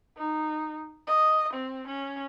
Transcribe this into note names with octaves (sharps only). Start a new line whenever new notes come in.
D#4
D#5
C4
C#4